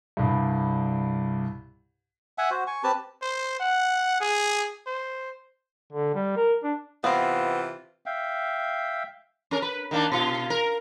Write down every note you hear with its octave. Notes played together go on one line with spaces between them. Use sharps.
C2 G2
E5 F#5 G#5
F#4 C5
G#5 C#6
C4 G4 B4 A5
C5
F#5
G#4
C5
D3
G3
A#4
D4
C3 E3 B3 C4 F4 F5 A#6 C7
E5 F5 G5
C#4 A#4
B4
D#3 A#3 D4
B2 F4
A#4